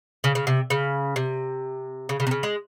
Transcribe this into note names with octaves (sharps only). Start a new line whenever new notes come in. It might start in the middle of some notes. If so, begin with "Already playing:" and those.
C#3
C#3
C3
C#3
C3
C#3
C#3
C3
C#3
G#3